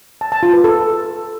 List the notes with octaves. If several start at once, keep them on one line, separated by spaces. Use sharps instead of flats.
A5
A5
F4
B4
A4